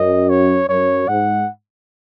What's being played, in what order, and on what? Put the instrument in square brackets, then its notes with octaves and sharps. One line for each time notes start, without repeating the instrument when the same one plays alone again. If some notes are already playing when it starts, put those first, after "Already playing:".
Already playing: [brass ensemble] F#2 [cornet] D#5
[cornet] C#5
[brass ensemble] F#2 [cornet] C#5
[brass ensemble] G#2 [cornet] F#5